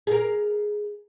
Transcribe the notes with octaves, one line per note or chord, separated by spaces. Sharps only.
G#4 A#4